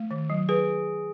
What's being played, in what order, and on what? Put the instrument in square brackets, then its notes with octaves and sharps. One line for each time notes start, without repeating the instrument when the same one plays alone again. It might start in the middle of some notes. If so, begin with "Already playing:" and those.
Already playing: [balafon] A3
D#3
F#3
[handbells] G#4 [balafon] B4